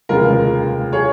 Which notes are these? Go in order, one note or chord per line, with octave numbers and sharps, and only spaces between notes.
F1 D#2 C#3 F3 G#3 F4 A#4
G#4 C#5